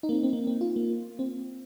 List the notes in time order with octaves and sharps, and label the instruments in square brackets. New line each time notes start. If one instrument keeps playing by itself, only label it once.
[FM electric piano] D#4
A#3
C4
C4
A#3
C4
F4
A#3
C4